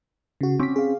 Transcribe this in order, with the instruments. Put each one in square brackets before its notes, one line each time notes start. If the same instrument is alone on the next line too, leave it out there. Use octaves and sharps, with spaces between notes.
[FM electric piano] C#3 F#4
[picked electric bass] C4 C#4 [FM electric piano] D6 B6
[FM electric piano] G#4 F5